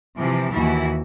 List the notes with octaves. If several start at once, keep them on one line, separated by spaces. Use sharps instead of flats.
C3 E3 F3
D#2 E3 E4 F#4